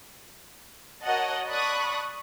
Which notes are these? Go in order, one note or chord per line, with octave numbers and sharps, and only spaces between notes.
F#4 A#4 C#5 D#5 F#5 A5
D5 A5 B5 C#6 D#6 F#6